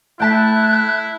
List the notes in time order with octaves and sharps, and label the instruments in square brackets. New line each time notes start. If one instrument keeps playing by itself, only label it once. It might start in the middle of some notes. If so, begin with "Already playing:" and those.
[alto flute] A3 [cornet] E4 [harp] G5 A5 B6 [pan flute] F#6